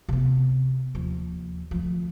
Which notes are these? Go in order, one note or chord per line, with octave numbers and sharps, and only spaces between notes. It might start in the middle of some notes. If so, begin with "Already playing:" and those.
C3 B3
D#2 F3
D2 F3